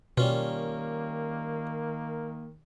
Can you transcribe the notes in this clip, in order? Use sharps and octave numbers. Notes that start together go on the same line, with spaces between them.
B2 D#3 G3 A#3 C#4 F4